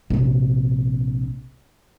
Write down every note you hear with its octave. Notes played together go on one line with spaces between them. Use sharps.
A#1 C3